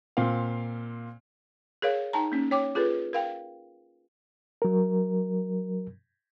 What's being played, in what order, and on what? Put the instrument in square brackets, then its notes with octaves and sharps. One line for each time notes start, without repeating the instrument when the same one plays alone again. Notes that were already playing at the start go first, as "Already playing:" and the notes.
[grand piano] A#2 C4 F5
[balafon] G#4 A#4 C#5 F5
D#4 G5 A5 A#5
A#3 C#4
C#5 G5 D6
F4 G#4 A4 B4
A#4 F5 G5
[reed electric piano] F#3 A#4